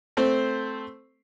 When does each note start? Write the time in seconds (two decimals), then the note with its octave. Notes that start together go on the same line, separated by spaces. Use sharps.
0.17 A3 C4 C5